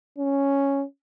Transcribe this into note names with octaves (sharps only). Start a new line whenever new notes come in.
C#4